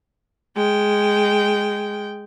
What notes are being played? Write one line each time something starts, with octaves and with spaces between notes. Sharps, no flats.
G#3 G5